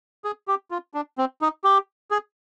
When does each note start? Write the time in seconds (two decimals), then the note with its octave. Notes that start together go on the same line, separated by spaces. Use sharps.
0.24 G#4
0.48 G4
0.71 F4
0.94 D4
1.18 C4
1.41 D#4
1.64 G4
2.11 G#4